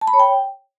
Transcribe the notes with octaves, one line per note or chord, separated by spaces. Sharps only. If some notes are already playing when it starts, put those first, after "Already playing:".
A5
B5
C#5
G5